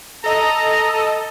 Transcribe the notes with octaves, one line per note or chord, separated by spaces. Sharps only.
A4 D#5 A#5